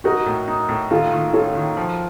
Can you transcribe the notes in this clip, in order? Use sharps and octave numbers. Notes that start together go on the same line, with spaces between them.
D#4 F#4 A#4
A2
D#4
A2
D#3 F4 A4
D#3
C#4 F4 A4
D#3
F3